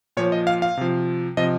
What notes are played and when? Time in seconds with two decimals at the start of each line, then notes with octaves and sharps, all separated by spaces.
0.17 A#2 F3 C#5
0.32 D#5
0.47 F5
0.62 F5
0.77 C3 F3
1.37 C3 F3 D#5